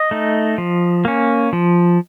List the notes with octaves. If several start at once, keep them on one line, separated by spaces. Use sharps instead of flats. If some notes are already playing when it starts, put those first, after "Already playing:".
Already playing: D#5
A3 D#4
F3
A#3 C#4
F3